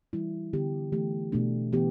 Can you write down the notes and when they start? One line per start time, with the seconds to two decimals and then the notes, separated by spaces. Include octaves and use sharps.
0.13 E3 G3 E4
0.53 D3 B3 G4
0.92 E3 A3 G4
1.32 B2 A3 D4
1.73 E3 B3 G4